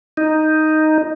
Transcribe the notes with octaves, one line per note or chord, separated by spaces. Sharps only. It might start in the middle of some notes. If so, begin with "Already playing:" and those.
D#4